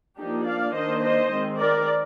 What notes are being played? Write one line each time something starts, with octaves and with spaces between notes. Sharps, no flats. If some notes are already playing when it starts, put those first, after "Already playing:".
F3 A#3 D4 D#4 G4
D5 F5
D#3 A#3 D4 C5 D#5
C5 D#5
D#3 G#3 C4
A#4 D5